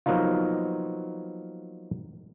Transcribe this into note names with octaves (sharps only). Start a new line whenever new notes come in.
F3 F#3 A#3 B3 D#4 F4